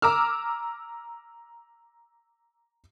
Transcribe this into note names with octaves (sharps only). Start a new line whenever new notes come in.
A#5 D6 E6 F6